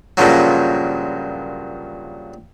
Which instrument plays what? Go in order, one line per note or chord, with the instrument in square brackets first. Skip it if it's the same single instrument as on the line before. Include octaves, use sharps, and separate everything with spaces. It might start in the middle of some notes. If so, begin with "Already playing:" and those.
[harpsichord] G2 A#2 C#3 F3 F#3